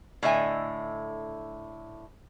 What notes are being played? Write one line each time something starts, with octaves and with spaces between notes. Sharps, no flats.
A2 D3 D#5 E5 G#5